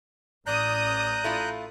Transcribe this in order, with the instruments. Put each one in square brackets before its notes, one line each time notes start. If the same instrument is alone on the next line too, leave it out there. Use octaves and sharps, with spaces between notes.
[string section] A1 D#6 [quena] D5 [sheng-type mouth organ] A#5 F#6 G6
[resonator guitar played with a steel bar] A3 E4 F4